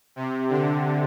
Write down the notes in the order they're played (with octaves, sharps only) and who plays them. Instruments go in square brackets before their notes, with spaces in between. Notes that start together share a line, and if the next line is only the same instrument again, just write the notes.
[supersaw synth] C3
D3